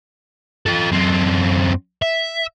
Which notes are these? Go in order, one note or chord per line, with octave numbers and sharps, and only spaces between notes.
F4 A4
F#2 C4
E5